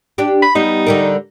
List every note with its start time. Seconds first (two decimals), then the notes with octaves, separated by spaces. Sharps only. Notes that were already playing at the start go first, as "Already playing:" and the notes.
0.18 D4 G4
0.43 B5
0.55 G3 B3 D#4
0.86 D3 G3 A#4